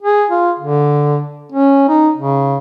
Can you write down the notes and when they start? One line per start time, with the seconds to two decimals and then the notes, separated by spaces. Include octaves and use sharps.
0.02 G#4
0.31 F4
0.59 D3
1.52 C#4
1.89 D#4
2.18 C#3